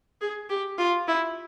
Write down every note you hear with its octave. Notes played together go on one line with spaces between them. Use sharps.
G#4
G4
F4
E4